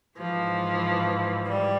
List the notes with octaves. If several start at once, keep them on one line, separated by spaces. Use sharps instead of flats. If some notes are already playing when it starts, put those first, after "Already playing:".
G#2 E3 F3
G3